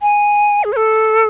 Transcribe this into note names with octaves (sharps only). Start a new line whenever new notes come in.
G#5
G#4
C#5
A4